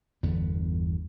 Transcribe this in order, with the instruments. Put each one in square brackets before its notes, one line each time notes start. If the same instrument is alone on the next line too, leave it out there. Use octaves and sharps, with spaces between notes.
[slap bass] G1 E2 D3 B3